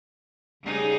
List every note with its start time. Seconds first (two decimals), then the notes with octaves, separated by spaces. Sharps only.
0.63 C#3 G3 D#4 G#4